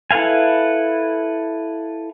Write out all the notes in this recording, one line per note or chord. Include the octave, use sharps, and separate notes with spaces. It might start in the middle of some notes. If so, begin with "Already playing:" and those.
E4 A4 B4 F5 G#5